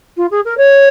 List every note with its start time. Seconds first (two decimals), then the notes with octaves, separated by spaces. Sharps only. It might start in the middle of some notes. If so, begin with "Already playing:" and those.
0.17 F4
0.31 G#4
0.45 A#4
0.57 C#5